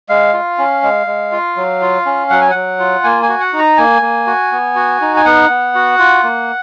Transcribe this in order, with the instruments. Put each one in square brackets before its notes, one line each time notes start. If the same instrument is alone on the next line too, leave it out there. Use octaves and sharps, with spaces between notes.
[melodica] G#3 F5
F4
C#4
G#3
G#3
F4
F#3
F4
C#4
F#3 F#5
G#5
F#3 F#5
F4
A#3 G#5
G#5
F#4
F#5
D#4
A#5
A#3 G#5
A#3
F#4
B3
F#4
D#4
G#5
B3 F#5
B3
F#4
F4
A#3